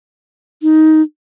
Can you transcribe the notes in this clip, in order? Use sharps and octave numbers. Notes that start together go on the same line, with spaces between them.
D#4